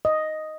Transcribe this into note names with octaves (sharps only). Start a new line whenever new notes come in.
D#5